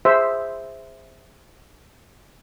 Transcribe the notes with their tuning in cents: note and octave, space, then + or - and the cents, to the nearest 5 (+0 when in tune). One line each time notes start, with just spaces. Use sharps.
G#4 -20 C5 +0 E5 +0